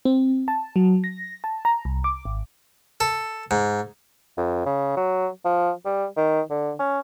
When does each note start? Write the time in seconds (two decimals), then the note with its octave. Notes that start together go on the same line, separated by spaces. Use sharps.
0.05 C4
0.48 A5
0.76 F#3
1.04 A#6
1.44 A5
1.65 A#5
1.85 C2
2.04 D6
2.25 G#1
3.00 A4
3.51 G#2
4.37 F2
4.66 C#3
4.97 F#3
5.45 F3
5.85 G3
6.17 D#3
6.50 D3
6.79 C#4